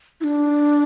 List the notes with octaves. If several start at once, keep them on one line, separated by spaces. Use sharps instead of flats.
E4
D4